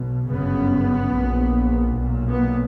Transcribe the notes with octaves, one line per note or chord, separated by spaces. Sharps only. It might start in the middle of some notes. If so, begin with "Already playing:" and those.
Already playing: B1 B2
G1 F#2 C#3 B3
A#1 A#2
B1 A#2
B3